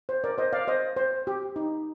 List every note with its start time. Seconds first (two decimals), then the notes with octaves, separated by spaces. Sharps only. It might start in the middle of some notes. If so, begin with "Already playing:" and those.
0.09 C5
0.24 A#4 D5
0.38 C5 D#5
0.53 D5 F5
0.68 C5 D#5
0.97 C5
1.27 G4
1.56 D#4